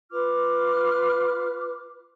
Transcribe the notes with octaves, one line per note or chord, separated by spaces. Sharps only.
F4 B4 D6 F6